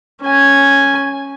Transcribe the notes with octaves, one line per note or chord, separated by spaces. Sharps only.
C#4 G#5